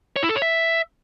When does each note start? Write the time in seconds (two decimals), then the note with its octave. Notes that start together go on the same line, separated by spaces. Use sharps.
0.16 C#5
0.23 E4
0.29 A4
0.36 C#5
0.42 E5